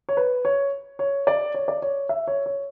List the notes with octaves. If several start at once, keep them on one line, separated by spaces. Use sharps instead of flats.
C#5
B4
C#5
C#5
D5
C#5
D5
C#5
E5
C#5
C#5